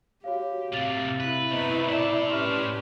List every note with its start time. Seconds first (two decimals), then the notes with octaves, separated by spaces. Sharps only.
0.24 F#4 G4 C#5 F5
0.73 A2 C3 A#3 F5 A6 F7
1.20 E4 B4
1.51 B2 A3 B3 B4 C5 D#5 A#5
1.88 A2 D5 A5
2.29 C#4 G4 B4 C6 C#6 F6